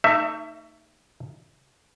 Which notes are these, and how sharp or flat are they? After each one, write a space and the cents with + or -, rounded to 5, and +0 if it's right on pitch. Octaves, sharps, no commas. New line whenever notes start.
A3 +40 D#4 +0 E5 +10